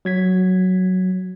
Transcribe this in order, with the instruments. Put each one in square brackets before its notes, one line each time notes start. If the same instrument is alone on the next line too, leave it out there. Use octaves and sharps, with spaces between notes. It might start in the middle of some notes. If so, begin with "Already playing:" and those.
[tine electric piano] F#3 G#6 B6